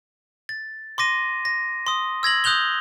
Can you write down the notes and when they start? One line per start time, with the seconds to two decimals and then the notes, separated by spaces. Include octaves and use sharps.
0.49 A6
0.98 C6 D6 A#6 D#7
1.45 A#6
1.87 C6 D#6
2.23 E6 G#6 A#6 F#7
2.44 D#6 F#6 G6 F7 G7